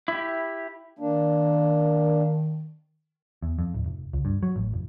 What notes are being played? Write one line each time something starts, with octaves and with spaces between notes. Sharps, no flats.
E4 G4
D#3 A#3 D4
E2
F2
D1
F1
C#2
G2
F#3
A1
F1